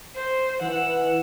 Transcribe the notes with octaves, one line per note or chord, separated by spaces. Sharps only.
C5
E3 F#5 E6